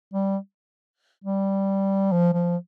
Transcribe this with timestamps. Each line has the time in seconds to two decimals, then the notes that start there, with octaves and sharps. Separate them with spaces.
0.14 G3
1.24 G3
2.12 F3
2.34 F3